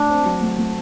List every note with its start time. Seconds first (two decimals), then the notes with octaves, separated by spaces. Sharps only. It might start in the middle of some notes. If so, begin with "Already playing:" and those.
Already playing: A3 D4
0.10 C4
0.25 F#3
0.42 A3
0.59 A3